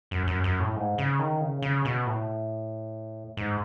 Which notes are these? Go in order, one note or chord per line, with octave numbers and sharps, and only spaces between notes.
F#2
F#2
F#2
A2
G#2
C#3
D#3
C#3
C#3
B2
A2
G#2